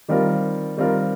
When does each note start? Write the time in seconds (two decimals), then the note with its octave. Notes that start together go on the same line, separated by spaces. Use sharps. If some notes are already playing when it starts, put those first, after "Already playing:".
0.09 D#3 G3 C4 F4 A#4
0.77 D#3 G3 C4 F4 A#4